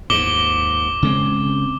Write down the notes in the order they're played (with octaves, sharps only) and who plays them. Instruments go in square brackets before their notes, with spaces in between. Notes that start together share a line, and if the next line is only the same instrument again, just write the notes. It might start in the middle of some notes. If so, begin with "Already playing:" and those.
[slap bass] D#2 G#2 [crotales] D6 G7
[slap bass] C#3 G#3 C4